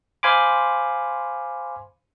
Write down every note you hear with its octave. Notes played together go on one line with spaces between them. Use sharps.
C5 F5 G#5 B5 C6 D6